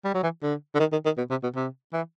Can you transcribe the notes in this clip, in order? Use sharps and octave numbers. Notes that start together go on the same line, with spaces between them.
G3
F#3
E3
D3
D3
D#3
D#3
D#3
B2
C3
B2
C3
E3